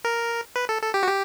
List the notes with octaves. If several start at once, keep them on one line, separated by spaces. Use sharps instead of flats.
A#4
B4
A4
A4
G4
F#4
G4